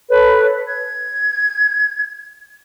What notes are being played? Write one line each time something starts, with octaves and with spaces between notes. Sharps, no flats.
A4 B4 C#5
G#6